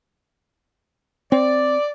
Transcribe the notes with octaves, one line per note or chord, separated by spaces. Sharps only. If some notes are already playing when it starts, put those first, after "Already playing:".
C4 D5